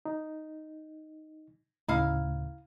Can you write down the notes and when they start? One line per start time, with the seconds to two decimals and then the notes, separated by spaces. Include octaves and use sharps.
0.05 D#4
1.88 D2 A2 C#3 A3 D#4 E4 F5